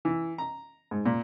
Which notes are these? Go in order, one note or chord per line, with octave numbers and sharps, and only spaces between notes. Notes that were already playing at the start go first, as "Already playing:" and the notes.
E3
A#5
G#2
A#2